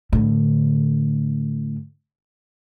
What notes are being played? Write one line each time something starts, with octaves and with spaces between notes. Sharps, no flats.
A2 D3